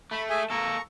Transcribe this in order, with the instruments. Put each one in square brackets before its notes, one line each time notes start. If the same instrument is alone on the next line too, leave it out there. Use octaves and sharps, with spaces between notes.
[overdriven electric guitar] A3 [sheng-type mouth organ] B5
[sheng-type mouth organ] G#4 E5 G#5
[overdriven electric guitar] A#3 A4 [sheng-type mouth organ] A#5 C#6